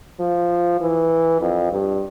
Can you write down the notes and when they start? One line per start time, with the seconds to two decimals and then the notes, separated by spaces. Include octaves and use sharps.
0.20 F3
0.81 E3
1.41 F2
1.72 G2